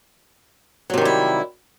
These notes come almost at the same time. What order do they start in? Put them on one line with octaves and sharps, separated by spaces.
F#3 C3 D#3 G3 E4